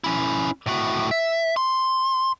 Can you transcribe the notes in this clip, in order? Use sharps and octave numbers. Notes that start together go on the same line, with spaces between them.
C#4 E4
A2 F#4
E5
C6